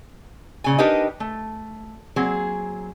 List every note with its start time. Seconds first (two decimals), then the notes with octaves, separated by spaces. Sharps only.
0.64 A#2 C#3 G#5
0.78 D4 D#4 G4 A#4 B4 D#5
1.20 A3
2.16 F#3 A#3 C4 G#4